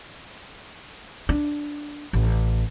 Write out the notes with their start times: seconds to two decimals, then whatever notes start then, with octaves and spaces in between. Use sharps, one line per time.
1.29 D4
2.13 A1